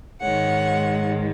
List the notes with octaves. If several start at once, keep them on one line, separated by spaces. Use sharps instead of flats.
G#2 D#3 G#3 C#5 F#5